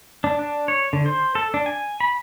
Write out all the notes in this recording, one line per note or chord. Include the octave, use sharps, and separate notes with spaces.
D4
D4
C#5
D3
C5
A4
D4
G#5
B5